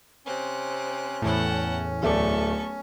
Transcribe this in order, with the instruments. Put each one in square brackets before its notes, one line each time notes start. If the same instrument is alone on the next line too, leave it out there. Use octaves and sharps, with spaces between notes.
[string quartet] C3 C4 F#6 [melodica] C#4
[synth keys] E2 A2 [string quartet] F#5 G5 A5
[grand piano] D1 A3 D5 [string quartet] B3 A4 C#6